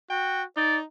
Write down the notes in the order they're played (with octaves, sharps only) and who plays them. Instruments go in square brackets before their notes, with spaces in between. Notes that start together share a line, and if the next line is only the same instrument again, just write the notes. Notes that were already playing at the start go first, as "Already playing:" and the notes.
[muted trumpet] F#4 [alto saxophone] G5
[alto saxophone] D#4 [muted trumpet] D5